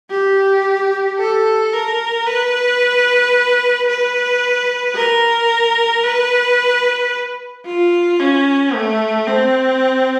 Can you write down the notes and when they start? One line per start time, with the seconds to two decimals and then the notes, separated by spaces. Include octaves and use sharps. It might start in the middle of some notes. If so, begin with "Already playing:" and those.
0.11 G4
1.19 A4
1.73 A#4
2.26 B4
3.88 B4
4.96 A#4
6.04 B4
7.66 F4
8.20 C#4
8.74 A3
9.28 C4